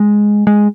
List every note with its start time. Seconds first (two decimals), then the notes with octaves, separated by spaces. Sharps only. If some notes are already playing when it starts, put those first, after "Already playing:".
Already playing: G#3
0.47 G#3